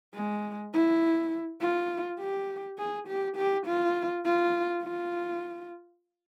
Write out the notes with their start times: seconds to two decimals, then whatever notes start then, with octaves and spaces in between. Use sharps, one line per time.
0.15 G#3
0.74 E4
1.61 F4
2.20 G4
2.79 G#4
3.08 G4
3.37 G4
3.66 F4
4.25 F4
4.83 F4